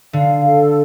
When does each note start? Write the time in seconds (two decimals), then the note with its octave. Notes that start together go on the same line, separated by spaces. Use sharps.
0.13 D3 F5
0.45 A4